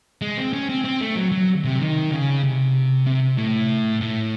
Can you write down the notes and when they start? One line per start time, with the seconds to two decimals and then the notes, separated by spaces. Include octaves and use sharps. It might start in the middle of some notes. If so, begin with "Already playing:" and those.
0.22 G#3
0.37 C4
0.53 C#4
0.69 C4
0.84 C4
1.01 A3
1.16 F#3
1.32 F#3
1.64 C3
1.80 D#3
2.11 C#3
2.43 C3
3.07 C3
3.38 A2
4.01 A2